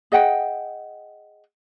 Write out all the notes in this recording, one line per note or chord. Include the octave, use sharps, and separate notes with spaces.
G#4 D#5 F#5 G5